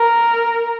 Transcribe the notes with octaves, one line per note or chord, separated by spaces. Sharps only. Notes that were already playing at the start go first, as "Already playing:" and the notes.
Already playing: A#4